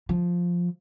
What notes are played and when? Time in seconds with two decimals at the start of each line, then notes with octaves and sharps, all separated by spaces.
0.09 F3